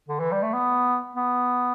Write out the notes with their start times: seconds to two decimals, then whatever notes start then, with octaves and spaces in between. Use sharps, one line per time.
0.08 D3
0.20 E3
0.32 G3
0.42 A3
0.54 B3
1.15 B3